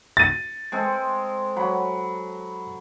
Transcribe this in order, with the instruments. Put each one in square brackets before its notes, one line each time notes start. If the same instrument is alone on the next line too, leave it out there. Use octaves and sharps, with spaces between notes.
[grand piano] A6 D#7
[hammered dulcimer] G#3 C4 A4
F#3 B5